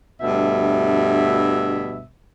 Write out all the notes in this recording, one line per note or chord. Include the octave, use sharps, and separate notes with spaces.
D2 G2 B2 E5